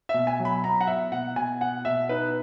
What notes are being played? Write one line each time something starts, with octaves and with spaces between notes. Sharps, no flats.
B2 E5
G#5
F#3
B5
B3 A#5
F#5
B3 E5
B2 F#5
B2 G#5
B3 F#5
B2 E5
D#4 B4